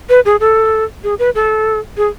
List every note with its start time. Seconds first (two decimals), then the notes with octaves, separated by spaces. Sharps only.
0.09 B4
0.25 G#4
0.40 A4
1.04 G#4
1.19 B4
1.35 A4
1.97 G#4